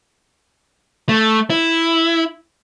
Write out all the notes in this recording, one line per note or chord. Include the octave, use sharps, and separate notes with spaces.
A3
E4